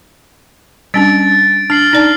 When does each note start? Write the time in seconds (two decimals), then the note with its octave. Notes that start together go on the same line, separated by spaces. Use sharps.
0.94 G3 C#4 D4 A6 D7
1.70 D4 F6 C7 F#7
1.93 D#4 D5 A5